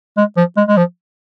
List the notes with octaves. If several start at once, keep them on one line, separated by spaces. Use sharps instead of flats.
G#3
F3
G#3
G#3
F3